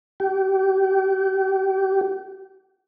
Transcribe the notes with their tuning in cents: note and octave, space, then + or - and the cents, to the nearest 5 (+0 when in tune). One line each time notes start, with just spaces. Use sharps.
G4 -35